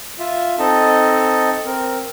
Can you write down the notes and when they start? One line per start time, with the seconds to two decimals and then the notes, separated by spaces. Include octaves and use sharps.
0.19 F4 E5
0.59 C4 D#4 A4 D#5 A5
1.66 C4 A#4